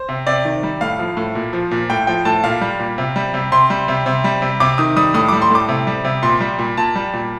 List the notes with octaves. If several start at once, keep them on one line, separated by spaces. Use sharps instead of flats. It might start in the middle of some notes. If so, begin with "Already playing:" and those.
Already playing: C5
C3
C3 D5
D#3
G3
A2 F5
F3
A2
A#2
F3
A#2
A2 G5
F3 G5
A2 A5
A#2 F5
G3
A#2
C3
G3
C3
C3 C6
G3
C3
C3
G3
C3
C3 D6
D#3 D#6
G3 D#6
A2 D#6
G3 D6
C6
A2 D6
C3
G3
C3
A#2 C6
G3
A#2
A#2 A5
G3
A#2